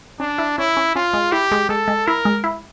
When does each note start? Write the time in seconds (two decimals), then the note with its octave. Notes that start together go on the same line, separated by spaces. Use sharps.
0.20 C#4 D4
0.38 E4
0.58 C#4 E4
0.77 C#4
0.95 C#4 F4
1.13 G#3
1.32 E4 G4
1.52 G#3
1.69 G#3 A4
1.88 G#3
2.07 E4 A#4
2.25 G#3
2.44 E4